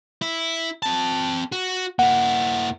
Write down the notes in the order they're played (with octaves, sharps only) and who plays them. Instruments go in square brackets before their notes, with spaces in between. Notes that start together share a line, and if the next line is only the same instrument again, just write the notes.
[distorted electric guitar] E4
C4 A5
F#4
[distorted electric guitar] A#3 E4 [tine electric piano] F#5